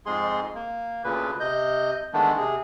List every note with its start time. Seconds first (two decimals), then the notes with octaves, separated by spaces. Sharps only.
0.06 F2 G#2 G#3 G#4 C6
0.55 A#3
1.04 D2 A#2 C#3 B4
1.40 C3 D#5 G6
2.13 D#3 E3 G#3 A3 B3 D4
2.37 C3 G#4